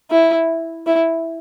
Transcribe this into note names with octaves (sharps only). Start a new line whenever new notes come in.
E4
E4